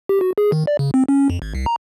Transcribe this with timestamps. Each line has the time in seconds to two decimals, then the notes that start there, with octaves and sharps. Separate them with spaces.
0.09 G4
0.21 F#4
0.38 G#4
0.52 D#3
0.67 D5
0.79 C#3
0.94 C4
1.08 C#4
1.30 F2
1.42 G#1
1.55 C2
1.66 A#5